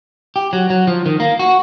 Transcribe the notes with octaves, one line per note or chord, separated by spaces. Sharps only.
G4
F#3
F#3
F3
D#3
A#3
F#4